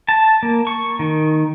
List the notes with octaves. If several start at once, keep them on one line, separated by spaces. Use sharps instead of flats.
A5
A#3
C#6
D#3